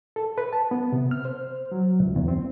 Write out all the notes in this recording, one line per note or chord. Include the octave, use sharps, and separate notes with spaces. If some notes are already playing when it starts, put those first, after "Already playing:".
A4
B4
A5
B3
C3
F6
C5
F#3
C#2
E2
C4